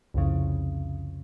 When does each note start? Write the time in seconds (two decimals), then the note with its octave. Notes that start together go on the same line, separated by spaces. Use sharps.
0.14 C2 F2 C#3